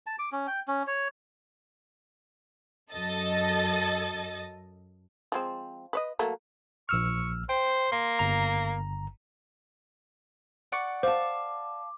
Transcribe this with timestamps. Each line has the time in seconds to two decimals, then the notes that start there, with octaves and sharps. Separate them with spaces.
0.07 A5
0.19 D6
0.32 C#4
0.47 G5
0.68 C#4
0.87 C#5
2.93 F#2 A4 D#5 A6
5.32 F3 G#3 C4
5.93 B4 C#5 D#5
6.19 F#3 A3 A#3
6.89 A#1 C#6 E6 F6
7.49 C5 G5
7.92 A#3 C6
8.19 G1 A#5
10.72 D5 F#5 C#6
11.03 C5 F5 A5 D6